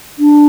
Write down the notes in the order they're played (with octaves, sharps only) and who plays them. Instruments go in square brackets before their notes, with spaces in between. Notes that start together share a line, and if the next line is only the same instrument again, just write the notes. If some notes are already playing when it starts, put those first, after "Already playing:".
[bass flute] D4